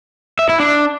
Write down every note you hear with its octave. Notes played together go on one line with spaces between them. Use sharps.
E5
E4
D4